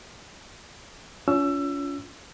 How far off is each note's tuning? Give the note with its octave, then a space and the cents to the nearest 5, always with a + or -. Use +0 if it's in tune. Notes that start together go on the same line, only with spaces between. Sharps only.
C#4 +35 F4 +0 E6 +25